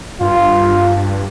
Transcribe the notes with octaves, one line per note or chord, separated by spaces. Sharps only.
G2 F4